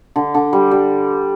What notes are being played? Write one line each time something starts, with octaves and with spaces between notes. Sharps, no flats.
D3
D3
G3
G3